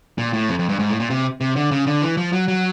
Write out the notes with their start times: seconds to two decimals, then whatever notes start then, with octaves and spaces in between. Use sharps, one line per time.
0.18 A#2
0.33 A2
0.49 F2
0.59 F2
0.69 G2
0.79 G#2
0.90 A2
1.00 A#2
1.10 C3
1.41 C3
1.56 D3
1.71 C#3
1.87 D3
2.02 E3
2.17 F3
2.33 F#3
2.48 F#3